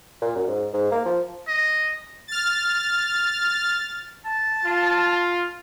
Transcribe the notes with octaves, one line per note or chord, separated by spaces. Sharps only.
A#2
F#2
G#2
G#2
A#3
F3
D#5
F6 A6
A5
F4